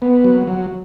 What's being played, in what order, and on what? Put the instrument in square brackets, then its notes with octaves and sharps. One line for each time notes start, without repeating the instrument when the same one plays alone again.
[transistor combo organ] B3
F#3
F#3